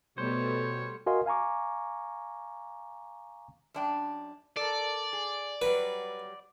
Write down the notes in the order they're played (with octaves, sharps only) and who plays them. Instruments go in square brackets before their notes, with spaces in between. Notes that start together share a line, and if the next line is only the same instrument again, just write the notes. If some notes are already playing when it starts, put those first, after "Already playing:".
[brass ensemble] B2 [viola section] G3 A3 B3 [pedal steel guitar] C5 [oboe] C#5
[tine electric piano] F#4 A#4 D#5 F5 G#5 C6
F5 G#5 A#5 C#6 D6
[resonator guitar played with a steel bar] F#2 D4 G5
[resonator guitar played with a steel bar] A4 A#4 [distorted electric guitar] D5
[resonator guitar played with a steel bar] G#4
[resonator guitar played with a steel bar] F#3 G3 [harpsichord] B4